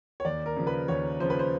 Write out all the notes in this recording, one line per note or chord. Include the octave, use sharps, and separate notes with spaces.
C#5
D#2 D5
A#4
C#3 F3
B4
D#2 C#5
C#3 F3 C5
B4
C5